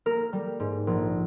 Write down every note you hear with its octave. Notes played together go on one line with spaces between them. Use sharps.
A#3 A#4
G3
G#2
A#1